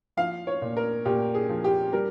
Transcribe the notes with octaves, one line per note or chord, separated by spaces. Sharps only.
F3 F5
C#5
A#2
A#4
A#2 G4
G#4
F3
G4
G3 A#4